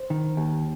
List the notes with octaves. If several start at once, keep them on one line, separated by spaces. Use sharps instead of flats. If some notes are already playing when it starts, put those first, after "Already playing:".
Already playing: C5
D#3
D#2